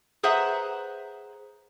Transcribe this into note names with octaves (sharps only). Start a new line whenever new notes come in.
G#4 B4 C5 E5 F#5 A#5